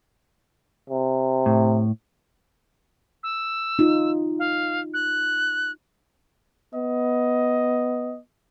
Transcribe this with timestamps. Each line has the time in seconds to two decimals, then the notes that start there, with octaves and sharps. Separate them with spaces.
0.90 C3
1.46 A2
3.23 E6
3.79 D#4 F4
4.39 F5
4.94 F#6
6.74 B3 D#5